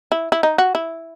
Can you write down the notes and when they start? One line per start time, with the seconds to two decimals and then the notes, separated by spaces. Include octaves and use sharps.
0.12 E4
0.32 E4
0.43 D#4
0.58 F#4
0.75 E4